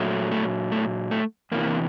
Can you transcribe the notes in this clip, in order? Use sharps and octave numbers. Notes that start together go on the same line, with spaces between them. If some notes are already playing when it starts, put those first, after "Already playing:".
Already playing: A#2 F#3 A3
A3
A3
A3
E2 C3 E3 A#3